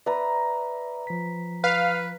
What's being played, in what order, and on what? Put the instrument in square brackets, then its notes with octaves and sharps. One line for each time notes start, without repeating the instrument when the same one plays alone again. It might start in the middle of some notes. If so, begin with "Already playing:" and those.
[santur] B4 A#5 [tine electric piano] D5 E5
[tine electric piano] F3 B6
[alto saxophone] B4 [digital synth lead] F5